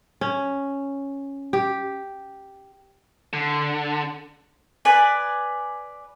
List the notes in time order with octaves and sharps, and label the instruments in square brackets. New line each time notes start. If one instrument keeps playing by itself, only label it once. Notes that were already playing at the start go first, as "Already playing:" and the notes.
[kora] C#4
G4
[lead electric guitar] D3
[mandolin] B4 D5 G#5